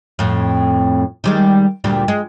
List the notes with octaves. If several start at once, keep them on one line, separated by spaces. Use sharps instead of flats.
F2 A2
D#3 G3 G#3
D2 A#2 G3
G#3